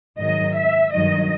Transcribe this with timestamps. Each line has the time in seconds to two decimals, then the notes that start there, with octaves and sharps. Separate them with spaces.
0.19 G#2 D#3 F#3 D#5
0.56 E5
0.93 G2 D#3 F#3 D#5